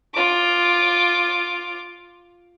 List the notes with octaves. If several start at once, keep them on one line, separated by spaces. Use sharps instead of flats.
F4 D6